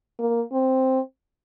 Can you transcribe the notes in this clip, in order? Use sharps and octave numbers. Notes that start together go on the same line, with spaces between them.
A#3
C4